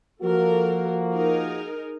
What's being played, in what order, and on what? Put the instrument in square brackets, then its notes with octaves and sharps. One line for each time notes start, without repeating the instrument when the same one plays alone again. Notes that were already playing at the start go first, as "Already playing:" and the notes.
[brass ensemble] F3 A#3 F#4 [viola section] A4 A#4
[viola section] D#4 G#4 A#4